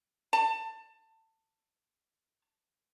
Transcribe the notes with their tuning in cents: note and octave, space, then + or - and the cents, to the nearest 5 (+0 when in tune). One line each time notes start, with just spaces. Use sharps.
A5 +20